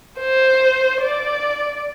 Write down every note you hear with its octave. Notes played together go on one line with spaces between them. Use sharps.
C5
D5